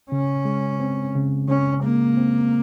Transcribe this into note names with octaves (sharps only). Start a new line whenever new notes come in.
C#3 C#4
G#3
C4
C#3
C#3 C#4
G#3 A#3
C4